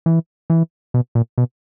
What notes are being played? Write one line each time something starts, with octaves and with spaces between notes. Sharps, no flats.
E3
E3
B2
A#2
B2